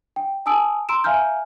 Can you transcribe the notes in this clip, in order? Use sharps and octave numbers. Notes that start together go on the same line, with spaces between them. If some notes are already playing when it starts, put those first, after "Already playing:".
G5
G#5 A5 D#6 E6 D7
A#5 C6 E6 D7 E7
E5 F5 G#5 A#5 F6 G6